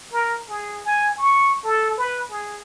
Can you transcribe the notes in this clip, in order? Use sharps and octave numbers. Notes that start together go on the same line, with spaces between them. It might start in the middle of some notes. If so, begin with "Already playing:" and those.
A#4
G#4
G#5
C#6
A4
B4
G#4